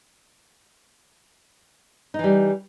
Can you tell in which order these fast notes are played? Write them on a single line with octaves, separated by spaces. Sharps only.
D#4 E3 G3